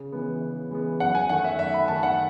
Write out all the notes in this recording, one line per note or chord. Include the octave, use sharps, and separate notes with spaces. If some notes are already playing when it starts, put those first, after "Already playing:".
Already playing: C#3
E3 G#3 B3
C#3
E3 G#3 B3
F#2 F#5
G#5
D#3 A3 F#5
E5
F#2 E5
B5
D#3 A3 A5
F#5